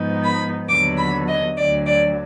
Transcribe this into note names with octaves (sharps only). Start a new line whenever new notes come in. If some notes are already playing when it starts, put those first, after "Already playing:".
Already playing: G#2 F3 B3 D#4
B5
D#2 D3 F#3 B3 D6
B5
D#5
D2 D3 F#3 D5
D5